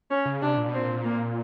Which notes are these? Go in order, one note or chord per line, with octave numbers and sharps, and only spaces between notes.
C#4
C#3
C3 D4
A#2
B2 C4
A#2
A#3